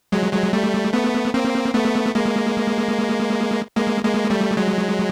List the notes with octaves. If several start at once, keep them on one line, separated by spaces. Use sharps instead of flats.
F#3 G#3
F#3 G#3
G3 A3
A3 B3
A#3 C4
A3 B3
G#3 A#3
G#3 A#3
G#3 A#3
G3 A3
F#3 G#3